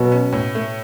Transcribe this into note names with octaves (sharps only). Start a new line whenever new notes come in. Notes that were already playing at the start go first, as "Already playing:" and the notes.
Already playing: B2 F#3
C#4
A2
A3